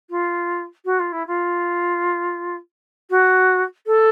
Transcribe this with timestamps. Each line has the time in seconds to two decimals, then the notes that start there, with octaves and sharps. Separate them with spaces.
0.10 F4
0.85 F#4
0.99 F4
1.12 E4
1.27 F4
3.10 F#4
3.86 A4